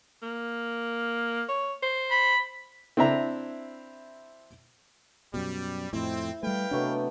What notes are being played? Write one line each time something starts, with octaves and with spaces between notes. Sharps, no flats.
A#3
C#5
C5
B5
C4 D4 E4 E5 A#5
F#2 B2 G3
F2 A2 C4 E4
G3 A3 B4 F5 G5
C3 F#3 A3 B3 D4